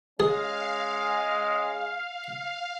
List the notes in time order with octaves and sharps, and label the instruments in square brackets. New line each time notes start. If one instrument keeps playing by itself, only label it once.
[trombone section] G#3 C#4 [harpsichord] G#4 [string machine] F5